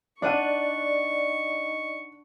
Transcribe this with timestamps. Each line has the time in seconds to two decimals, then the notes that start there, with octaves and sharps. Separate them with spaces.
0.22 D4 D#4 D5 F#5 C#6 F#6 D#7